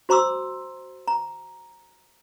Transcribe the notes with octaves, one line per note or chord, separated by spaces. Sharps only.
F#4 C5 A#5 C6 D6 E6
A#5